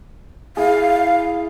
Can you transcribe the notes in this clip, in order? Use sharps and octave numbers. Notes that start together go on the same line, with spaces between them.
E4 G#4 F5